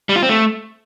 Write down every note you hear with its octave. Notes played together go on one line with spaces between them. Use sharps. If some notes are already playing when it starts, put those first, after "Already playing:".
G3
F4
C4
A3